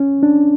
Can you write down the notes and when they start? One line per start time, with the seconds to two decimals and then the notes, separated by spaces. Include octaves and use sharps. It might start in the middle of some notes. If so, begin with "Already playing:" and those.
Already playing: C#4
0.23 D4